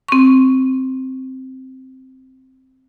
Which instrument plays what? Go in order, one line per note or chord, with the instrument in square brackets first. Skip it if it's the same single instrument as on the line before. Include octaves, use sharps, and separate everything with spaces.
[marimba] C4 C#6